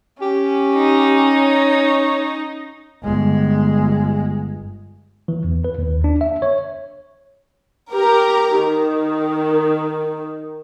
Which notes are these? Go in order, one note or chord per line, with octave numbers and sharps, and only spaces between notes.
C#4 G4
D#4
C#5
G1 G#3
E3
E2
B4
D#2
D4
E5
C#5
G4 A#4
D#3